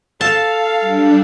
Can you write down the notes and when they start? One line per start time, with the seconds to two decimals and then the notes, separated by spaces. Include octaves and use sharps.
0.21 A4 F5 A5
0.80 G3 D4